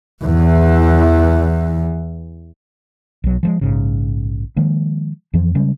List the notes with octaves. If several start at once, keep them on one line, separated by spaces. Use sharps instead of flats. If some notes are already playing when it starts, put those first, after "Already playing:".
E2 E3
B1 F#3
F3 F#3 G#3
A#1 G#2 C#3
D#3 F3 G#3 A#3
F2 E3 F3
C#3 G3 G#3 C#4